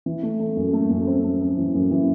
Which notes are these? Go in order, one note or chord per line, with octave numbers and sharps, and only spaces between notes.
E3
A3
A3
F#2
A3
F#2
C4
A3
C4
E3
F#2
E3